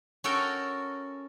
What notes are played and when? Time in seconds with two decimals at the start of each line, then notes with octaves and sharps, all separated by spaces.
0.24 C#4 F#4 A4 A#4 G5